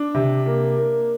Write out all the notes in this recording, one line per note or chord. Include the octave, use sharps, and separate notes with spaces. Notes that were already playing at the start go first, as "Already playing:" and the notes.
Already playing: D4
C3
A#3
A#3